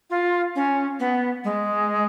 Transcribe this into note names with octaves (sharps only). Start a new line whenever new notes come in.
F4
C#4
B3
G#3